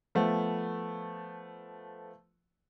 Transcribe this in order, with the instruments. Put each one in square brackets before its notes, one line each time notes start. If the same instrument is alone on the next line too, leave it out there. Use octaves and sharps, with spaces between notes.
[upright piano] F3 A3 B3